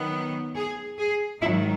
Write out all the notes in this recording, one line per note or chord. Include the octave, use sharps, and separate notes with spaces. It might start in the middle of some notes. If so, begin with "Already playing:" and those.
Already playing: D#3 F#3 B3
G#4
G#4
G#2 D#3 F#3 E4